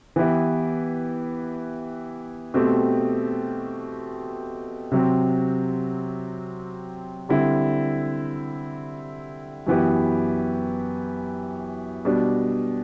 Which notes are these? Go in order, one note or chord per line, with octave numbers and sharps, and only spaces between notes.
E3 B3 E4 G4
B2 A3 C4 G4
C3 F#3 C4
D3 G3 C4 E4
F#2 E3 B3 E4 G4
B2 G3 D4